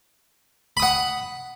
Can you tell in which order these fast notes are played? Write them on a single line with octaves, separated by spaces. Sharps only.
B5 D#6 F#5